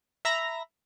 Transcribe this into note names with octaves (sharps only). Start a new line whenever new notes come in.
E5 A#5 B5 A#6